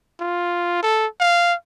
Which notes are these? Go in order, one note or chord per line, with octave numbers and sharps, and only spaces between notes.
F4
A4
F5